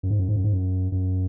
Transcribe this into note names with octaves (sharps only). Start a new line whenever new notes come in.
F#2
G#2
F#2
G#2
F#2
G#2
F#2
F#2